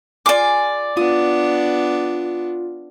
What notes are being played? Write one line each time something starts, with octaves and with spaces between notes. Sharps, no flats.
F4 G#4 D5 D6
B3 D4 F4 D#6